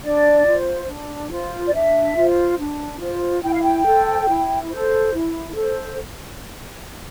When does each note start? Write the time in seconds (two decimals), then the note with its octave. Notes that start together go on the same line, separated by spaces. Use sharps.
0.03 D4 D5
0.46 F4 C5
0.88 D4
1.31 F4 C5
1.67 D5
1.73 D4 E5
2.16 F4 C5
2.59 D4
3.00 F4 C5
3.43 E4 G5
3.53 F5
3.63 G5
3.85 A4 C5
4.28 E4
4.70 A4 C5
5.13 E4
5.56 A4 C5